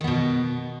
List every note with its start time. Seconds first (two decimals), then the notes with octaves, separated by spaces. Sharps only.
0.01 D#3
0.04 B3
0.07 B2